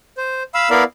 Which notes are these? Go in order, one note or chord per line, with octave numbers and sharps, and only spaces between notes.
C5
F5 B5 E6
B3 E4 A#4 D5 F5 B5